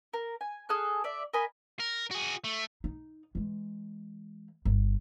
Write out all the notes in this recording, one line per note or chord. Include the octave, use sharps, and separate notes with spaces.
A#4
G#5
G#4 A4 F6 F#6
D5 E5
A#4 D#5 G#5 B5
A#4
F#4 G#4
A3
D#4
E3 G#3
G1